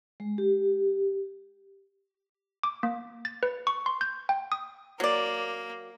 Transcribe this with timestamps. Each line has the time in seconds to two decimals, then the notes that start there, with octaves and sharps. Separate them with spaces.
0.20 G#3
0.38 G4
2.63 D6
2.83 A#3
3.25 A6
3.43 B4
3.67 C#6
3.86 C6
4.01 G6
4.29 G5
4.52 D#6
5.00 F#3 A#3 D5